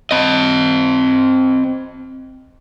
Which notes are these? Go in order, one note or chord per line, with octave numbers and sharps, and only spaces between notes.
C4 D#5